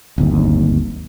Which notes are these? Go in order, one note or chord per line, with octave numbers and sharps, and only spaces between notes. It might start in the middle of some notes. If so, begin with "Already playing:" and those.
D1 G1 D#2